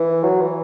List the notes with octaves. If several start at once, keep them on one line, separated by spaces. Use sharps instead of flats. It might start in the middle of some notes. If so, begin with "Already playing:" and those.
Already playing: E3
F#3
E3